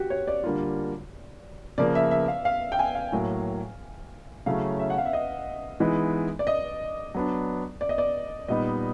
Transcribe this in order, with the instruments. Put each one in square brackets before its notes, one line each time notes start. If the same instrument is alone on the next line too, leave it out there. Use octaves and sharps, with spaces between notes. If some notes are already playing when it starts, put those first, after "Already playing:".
Already playing: [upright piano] F#4 G4
C#5
D5
[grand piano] D3 G3 A#3 D4 F4
[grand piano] C#3 F3 A#3 [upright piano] D5
[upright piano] E5
E5
F5
F5
G5
G#5
F5
[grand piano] A2 F#3 A#3
[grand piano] C#3 F#3 A3 C#4 E4 [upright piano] F5
[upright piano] E5
F#5
F5
E5
D#5
[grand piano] E3 G#3 B3 D#4
[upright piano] D5
D#5
[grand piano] F#3 B3 D4
[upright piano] D5
D#5
D5
[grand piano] A#2 G3 B3 D#4 [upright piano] D#5